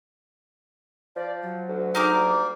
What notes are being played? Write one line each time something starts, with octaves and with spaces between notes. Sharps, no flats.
F3 D5
F#3
D2
D#4 G#4 A#4 C5 A#5 D6
G3 A#3